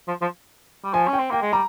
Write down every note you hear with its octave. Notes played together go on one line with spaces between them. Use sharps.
F3
F3
G3
F3 G#5
C#4
G5
C4
A#3 G5
G#3
G3 A#5